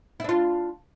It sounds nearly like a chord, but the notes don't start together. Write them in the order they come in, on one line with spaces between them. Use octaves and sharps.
E4 D4 F4